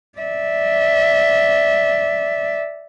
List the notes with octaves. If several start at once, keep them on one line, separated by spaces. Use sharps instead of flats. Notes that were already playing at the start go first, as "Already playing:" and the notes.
D5 E5